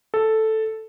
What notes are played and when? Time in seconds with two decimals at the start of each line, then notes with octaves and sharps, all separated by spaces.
0.14 A4